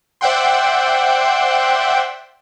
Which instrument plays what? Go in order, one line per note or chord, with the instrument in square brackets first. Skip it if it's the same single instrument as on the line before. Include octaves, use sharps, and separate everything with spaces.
[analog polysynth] C5 D5 E5 F#5 G5 C6